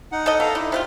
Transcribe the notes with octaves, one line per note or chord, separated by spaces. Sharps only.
D#4 F#5
A4 D#5
B2 A4 F5 A#5
D3 D#4 E4
C3 B3 F4